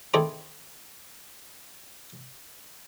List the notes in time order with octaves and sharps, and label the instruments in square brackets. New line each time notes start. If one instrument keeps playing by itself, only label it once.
[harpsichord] D#3 A3 C4 E4 G#4 D5